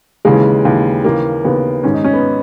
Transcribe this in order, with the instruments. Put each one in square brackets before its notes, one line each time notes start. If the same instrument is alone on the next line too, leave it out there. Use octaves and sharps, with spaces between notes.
[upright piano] D#2 C#3 E3 G#3
D#2 C#3 E3
D#2 C#3 E3 A#3
D#2 C#3 E3 B3
G#2 D#3 C#4
D#4
C#4
B3